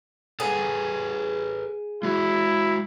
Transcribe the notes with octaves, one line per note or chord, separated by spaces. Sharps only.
G#4 A4 B4 F#5
G#3 E4 F#4